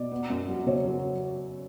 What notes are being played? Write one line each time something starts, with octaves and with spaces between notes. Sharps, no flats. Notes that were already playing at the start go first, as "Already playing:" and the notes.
Already playing: B2 D5
B3
F#2
F#3
C#3 C#5
F#3